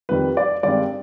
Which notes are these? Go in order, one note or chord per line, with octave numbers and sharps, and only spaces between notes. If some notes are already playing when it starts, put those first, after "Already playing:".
F2 D#3 G3 B4
D5
G2 D#3 G#3 C4 D5